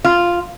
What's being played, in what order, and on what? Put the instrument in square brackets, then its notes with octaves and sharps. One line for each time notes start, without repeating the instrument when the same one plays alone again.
[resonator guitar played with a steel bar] F4